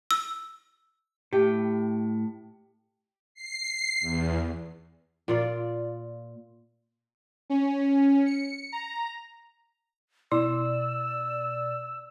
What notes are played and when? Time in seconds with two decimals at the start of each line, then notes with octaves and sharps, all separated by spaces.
0.11 E6
1.33 A2 G4
3.34 C7
4.00 E2
5.28 A#2 F4 D5
7.50 C#4
8.26 C#7
8.72 A#5
10.32 B2 E4 D5 E6